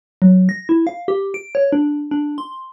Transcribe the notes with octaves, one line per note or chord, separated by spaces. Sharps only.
F#3
A#6
E4
F5
G4
D7
C#5
D4
D4
C6